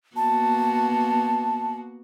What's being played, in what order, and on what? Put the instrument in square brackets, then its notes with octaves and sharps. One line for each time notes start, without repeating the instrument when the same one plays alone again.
[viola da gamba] A#3 B3 F#4 [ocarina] A5